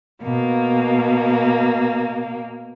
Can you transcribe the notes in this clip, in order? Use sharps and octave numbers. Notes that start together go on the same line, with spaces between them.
B2 A#3